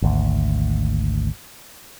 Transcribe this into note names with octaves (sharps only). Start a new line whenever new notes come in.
G#1 D2